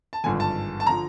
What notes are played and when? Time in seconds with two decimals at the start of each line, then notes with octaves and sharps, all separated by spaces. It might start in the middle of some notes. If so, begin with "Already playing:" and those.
0.13 A5
0.24 G#1 G2 D3 F3 G#5
0.40 A5
0.80 A5
0.87 D3 F3 A#5